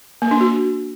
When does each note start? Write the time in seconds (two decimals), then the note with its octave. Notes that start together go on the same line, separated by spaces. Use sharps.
0.22 A#3
0.31 D4
0.41 F#4